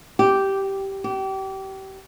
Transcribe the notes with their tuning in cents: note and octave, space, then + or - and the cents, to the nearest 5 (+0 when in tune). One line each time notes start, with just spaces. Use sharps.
G4 -10
G4 -30